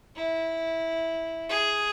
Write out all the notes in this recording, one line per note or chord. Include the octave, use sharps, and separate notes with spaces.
E4
G#4